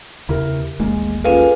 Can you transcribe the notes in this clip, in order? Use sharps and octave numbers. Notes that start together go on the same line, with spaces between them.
E2 C#3 E4 G4 A#4
D#1 A1 G#3 A#3
C#4 F4 G#4 A4 B4 F5 G#5 D#7